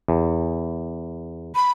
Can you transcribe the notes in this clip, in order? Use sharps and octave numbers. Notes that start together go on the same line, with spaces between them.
E2
B5